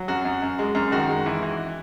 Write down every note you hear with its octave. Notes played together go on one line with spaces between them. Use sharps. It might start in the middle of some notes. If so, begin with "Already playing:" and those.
Already playing: F#3
F#2 F#4
F#2
F#2
G#3
F#2
D#3 F#4
G#3
E3
E3